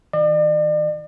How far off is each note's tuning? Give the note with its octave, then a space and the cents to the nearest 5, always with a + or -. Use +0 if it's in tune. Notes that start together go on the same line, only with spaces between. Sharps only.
E3 -45 D5 +40